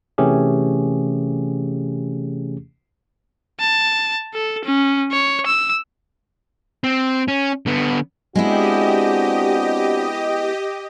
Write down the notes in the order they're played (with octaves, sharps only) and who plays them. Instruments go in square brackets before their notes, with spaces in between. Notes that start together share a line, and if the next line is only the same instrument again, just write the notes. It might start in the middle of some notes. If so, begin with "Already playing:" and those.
[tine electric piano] C3 E3 A3 C#4 G4 G#4
[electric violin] A5
A4
C#4
C#5
E6
[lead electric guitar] C4
C#4
D3 B3
[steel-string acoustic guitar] G#3 B3 E4 [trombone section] C4 D4 F#4 [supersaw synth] G4 D#5